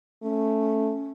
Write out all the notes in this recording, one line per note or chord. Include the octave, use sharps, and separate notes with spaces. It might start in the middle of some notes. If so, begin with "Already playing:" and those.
A3 C#4